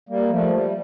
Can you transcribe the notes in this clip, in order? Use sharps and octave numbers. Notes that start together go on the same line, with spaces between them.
G3 A#3
F3 A3
G3